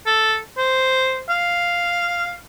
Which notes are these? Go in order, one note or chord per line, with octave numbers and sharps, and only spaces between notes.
A4
C5
F5